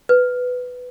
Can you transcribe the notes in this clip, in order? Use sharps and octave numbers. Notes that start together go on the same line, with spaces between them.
B4